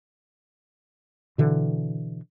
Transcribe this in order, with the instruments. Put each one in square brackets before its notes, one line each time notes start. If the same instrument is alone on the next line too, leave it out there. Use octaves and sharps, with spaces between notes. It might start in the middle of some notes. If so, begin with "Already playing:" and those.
[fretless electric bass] B2 D3 E3